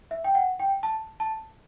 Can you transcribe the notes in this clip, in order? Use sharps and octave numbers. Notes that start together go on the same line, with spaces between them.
E5
G5
F#5
G5
A5
A5